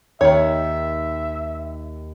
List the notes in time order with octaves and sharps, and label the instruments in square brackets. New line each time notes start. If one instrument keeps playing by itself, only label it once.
[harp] D#2 G5 C7 [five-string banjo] D#3 C#5 [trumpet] E5